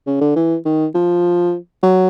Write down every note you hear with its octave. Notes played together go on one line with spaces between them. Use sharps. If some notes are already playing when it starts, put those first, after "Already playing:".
C#3
D3
E3
D#3
F3
F#3